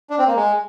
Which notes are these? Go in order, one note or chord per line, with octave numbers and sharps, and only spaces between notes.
D4
C4
A#3
G#3